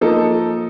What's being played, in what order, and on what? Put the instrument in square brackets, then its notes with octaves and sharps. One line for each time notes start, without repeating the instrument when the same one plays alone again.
[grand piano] F3 A#3 D#4 A4